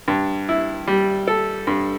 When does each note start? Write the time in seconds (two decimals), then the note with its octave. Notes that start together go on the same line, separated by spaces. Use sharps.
0.08 G2
0.49 E4
0.88 G3
1.28 A4
1.67 G2